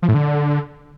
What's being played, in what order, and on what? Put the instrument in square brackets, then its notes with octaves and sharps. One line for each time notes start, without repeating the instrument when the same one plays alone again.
[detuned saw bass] F3
A2
D3